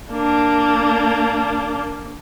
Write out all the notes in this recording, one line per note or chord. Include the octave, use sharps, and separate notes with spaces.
A#3 D4